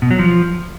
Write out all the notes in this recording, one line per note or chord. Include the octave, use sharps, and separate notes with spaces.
B2
F#3
F3